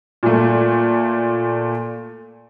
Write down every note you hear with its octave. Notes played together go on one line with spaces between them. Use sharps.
A#2 A3